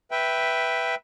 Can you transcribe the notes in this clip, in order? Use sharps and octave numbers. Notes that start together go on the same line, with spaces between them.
B4 E5 G5